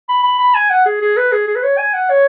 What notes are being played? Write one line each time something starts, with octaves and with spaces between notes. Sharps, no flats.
B5
B5
B5
G#5
F#5
G#4
G#4
B4
G#4
G#4
B4
C#5
G#5
F#5
C#5